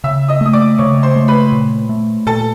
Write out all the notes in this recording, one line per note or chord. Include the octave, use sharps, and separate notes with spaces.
C#3 E5 E6
D#5 D#6
A3 D#6
D5 D6
C#3 C#5 C#6
C5 C6
A3
B4 B5
A#2
A3
A#2 A4 A5